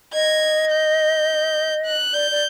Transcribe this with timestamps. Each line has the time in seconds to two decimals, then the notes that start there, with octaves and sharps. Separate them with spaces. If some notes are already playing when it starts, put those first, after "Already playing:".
0.13 D#5 G#6
0.71 G6
1.86 F#6
2.13 D5 G6
2.31 D5